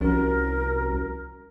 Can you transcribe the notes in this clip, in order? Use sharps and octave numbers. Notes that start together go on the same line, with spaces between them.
C2 F3 C#4 F#4 A#4